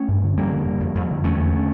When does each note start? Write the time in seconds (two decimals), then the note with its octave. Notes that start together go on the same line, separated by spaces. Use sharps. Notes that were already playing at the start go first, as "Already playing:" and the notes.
Already playing: A3 C#4
0.08 G2
0.23 D3
0.37 F2 G3 A#3
0.52 D3
0.66 D3
0.80 F2
0.95 F2
1.10 D3
1.24 E2 A3 C#4
1.38 D3
1.53 D3